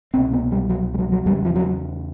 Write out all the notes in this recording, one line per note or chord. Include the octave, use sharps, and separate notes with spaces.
C2 B2 C4
B3
G3
F#3
G3
F#3
F#3
E2 C#3 G3
F3
F#3